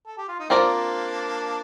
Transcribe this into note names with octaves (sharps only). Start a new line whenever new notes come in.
A4
G4
F4
D#4
A#3 C4 D4 F4 A#4 D5